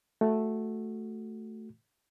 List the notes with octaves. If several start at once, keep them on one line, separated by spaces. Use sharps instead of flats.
A3 F#4